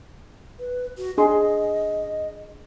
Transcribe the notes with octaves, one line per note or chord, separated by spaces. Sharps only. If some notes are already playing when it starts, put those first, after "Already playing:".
B4
F#4
D4 G#4 D#5 C6